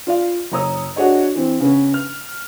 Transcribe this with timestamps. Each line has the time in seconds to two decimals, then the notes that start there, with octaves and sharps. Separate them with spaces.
0.07 F4 D5 F5
0.52 F#1 C#5 A#5 D#6 E6
0.96 D4 F#4 G#4 C#5 D#5
1.35 E3 C4
1.60 C#3 B3 C#4
1.94 F6